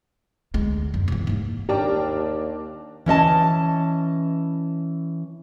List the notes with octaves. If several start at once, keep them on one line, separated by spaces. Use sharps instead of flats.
D2 G#3
F#2
C3 E3
G#2 A#3
D#2 D4 G4 A#4
E3 C#4 D#5 A5